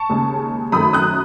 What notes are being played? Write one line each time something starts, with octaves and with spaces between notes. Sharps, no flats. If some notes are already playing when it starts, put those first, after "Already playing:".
Already playing: A5 C#6
D#2 C#3 G#3
F#2 D#3 A3 B5 D#6
D#6 F#6